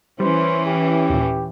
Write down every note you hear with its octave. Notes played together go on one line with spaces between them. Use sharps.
E3 G3 C#4 C5
G4
D#2 A#2